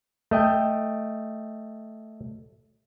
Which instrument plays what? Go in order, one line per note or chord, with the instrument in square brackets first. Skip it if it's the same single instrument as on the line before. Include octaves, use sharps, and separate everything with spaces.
[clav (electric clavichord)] A3 D#5 G5